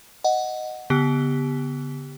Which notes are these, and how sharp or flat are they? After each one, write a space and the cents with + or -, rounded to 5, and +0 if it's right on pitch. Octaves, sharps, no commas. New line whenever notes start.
D#5 +0 F#5 +0
D3 -45 B3 +0 G4 +0